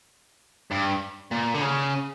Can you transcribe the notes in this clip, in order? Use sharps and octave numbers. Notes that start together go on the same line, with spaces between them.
G2
A#2
D3
C#3